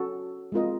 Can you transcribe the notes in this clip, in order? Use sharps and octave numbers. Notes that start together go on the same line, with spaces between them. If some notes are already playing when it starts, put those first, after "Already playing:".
Already playing: C#4 F#4 A4
G#3 C4 F4 A#4 D#5